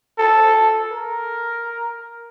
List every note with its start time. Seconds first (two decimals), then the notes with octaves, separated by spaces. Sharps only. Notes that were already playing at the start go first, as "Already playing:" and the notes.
0.19 A4
0.91 A#4